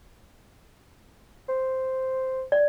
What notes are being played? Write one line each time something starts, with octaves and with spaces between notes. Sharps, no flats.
C5
D5